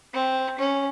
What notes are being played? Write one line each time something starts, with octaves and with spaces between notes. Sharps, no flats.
C4
C#4